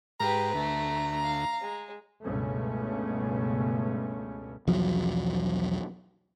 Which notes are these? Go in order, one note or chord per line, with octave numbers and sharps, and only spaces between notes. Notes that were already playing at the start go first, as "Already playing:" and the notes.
G#2 G4 B4 A#5
D2 A3
F5
G#3
C#2 G2 B2 A3 C#4
B1 E2 F3 F#3